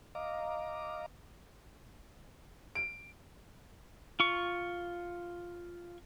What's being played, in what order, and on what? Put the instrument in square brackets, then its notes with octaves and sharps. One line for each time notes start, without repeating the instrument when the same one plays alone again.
[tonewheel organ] D#5 F5 A#5 D6
[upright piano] D7
[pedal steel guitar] F4 C#6